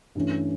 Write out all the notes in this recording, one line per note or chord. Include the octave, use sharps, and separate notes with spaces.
G2 E3 A3 C#4